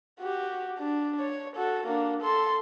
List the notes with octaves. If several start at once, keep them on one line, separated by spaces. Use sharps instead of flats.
F#4 G4
D4
C#5
F#4 A4
A#3 D4
A4 C6